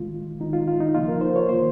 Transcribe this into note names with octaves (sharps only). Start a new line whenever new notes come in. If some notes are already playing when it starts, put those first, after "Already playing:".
Already playing: D#3 G#3 F4
D#3 G#3 D#4
F4
F4
D#4
C#3 F3 A#3 F4
A#4
C5
C#5
D#3 A#3 C5